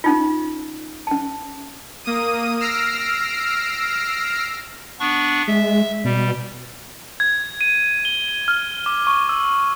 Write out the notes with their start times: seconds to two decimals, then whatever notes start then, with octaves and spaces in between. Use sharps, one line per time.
0.04 C#4 D#4 F4
1.07 C#4 A5
2.04 A#3 D#6 D#7
2.60 E6 F6 A#6 C7 D7
5.00 B3 D4 C#6
5.48 G#3 E5
6.04 B2 G3
7.20 G#6
7.61 D#7
8.05 G7
8.28 D#7
8.48 F6
8.86 D6
9.07 C#6
9.29 E6